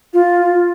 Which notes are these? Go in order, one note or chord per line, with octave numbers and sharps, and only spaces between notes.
F4